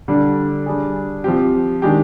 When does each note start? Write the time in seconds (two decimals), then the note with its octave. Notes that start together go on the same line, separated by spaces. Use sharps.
0.08 D3 G3 D4
0.66 G3 D4 G#4
1.24 F3 C4 G4
1.82 D#3 G#3 D4 G4